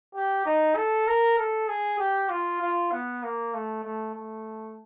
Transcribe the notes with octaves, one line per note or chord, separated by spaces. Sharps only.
G4
D#4
A4
A#4
A4
G#4
G4
F4
F4
B3
A#3
A3
A3
A3